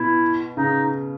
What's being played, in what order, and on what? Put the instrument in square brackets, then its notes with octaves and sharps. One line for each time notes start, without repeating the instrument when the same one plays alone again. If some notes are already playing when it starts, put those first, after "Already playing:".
Already playing: [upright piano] B2 [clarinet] E4
[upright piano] C#3 [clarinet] D#4